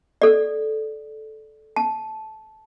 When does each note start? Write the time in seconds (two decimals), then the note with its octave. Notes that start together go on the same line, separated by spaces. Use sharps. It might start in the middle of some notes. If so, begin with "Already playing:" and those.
0.22 A4 D5
1.76 A5